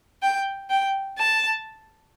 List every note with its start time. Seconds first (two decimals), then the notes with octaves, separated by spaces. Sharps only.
0.22 G5
0.70 G5
1.18 A5